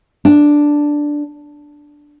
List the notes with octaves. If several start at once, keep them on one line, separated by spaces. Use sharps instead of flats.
D4